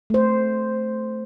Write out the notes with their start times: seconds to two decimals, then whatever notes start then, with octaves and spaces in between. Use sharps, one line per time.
0.10 A3 C5